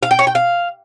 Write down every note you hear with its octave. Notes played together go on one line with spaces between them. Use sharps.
F5
G5
C#5
G5
F5